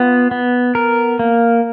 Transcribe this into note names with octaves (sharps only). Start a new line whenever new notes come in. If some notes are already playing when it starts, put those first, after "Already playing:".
Already playing: B3 F4
B3
A#4
A#3